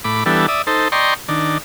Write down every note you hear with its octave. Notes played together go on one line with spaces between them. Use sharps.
A2 B5 D6
E3 G3 B3 D4 A4
D5 E5 D#6
D#4 A4 C5
D5 D#5 G5 A#5 C6 C#6
D#3 D4